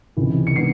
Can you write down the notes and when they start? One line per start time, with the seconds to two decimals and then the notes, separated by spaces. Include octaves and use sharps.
0.17 C#2 C3 E3
0.47 C#7
0.56 D#3 G#3 B3 D4 C7